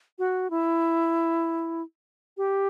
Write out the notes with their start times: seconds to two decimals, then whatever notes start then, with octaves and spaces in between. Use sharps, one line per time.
0.19 F#4
0.50 E4
2.37 G4